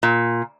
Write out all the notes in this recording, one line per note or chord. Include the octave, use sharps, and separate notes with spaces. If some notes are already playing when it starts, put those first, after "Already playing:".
A#2